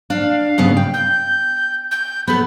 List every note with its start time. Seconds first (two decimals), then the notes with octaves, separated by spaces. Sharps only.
0.10 D4 F5
0.58 G2 C#3 B3
0.77 G5
0.94 G6
1.91 G6
2.28 B3 A4 B5